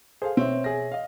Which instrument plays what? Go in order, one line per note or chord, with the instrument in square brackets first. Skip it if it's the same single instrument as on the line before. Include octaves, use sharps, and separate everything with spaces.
[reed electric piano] G#4 A4 [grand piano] C5 F5
[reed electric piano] B2 C#5 E5 [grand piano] C4
[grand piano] G#4 A#6
D#5 F5